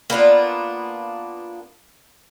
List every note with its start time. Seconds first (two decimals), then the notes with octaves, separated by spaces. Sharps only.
0.10 A#3 B3 D4 F4